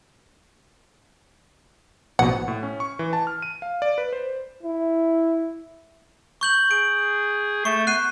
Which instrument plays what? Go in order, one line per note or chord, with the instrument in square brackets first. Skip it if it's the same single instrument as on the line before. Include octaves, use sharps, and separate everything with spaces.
[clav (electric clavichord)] A#1 B2 [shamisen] F#5
[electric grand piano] A2
C#4
C#6
E3
A5
F6
D#7
F5
D5
B4
C5
[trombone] E4
[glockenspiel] C#6 G6 F#7
[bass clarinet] G#4 [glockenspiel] D7
[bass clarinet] A3 [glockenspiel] C#6
[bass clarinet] B3 [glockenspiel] F#6 C7 D#7